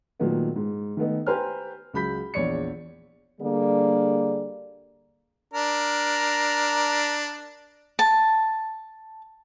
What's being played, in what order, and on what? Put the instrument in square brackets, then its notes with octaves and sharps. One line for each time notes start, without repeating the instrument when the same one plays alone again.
[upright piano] A#2 D#3 F#3 A3 B3 D#4
G#2
D#3 A3 B3 D#4
G4 B4 C5 G#5 A#5 F6
C#2 F#3 B5 G6 B6
A#1 E2 C#5 D5 C#7
[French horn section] D3 G3 A#3 D4 G#4 D5
[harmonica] D4 A#4
[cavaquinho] A5